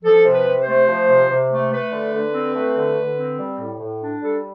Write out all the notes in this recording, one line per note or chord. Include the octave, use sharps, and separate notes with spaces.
F3 A4
C3
B4
C3
C5
A3
F3
C3
C3
A3
A3 B4
D3
D3
C4
A3
D3
D3
C4
G3
A2
A2
D4
G3 A4